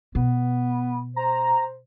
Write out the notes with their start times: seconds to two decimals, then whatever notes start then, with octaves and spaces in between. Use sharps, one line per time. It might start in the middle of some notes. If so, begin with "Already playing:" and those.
0.15 B2 B3
1.16 C5 A#5